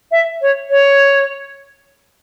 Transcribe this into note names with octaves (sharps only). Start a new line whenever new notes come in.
E5
C#5
C#5